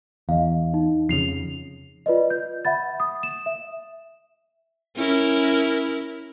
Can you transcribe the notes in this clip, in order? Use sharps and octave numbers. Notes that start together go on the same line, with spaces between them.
E2 D#5 F5
D#4
F2 C#3 C7 F7
F4 B4 D5 D#5
G6
E5 F#5 B5 A6
D#6
E7
E5
C#4 E4 A#4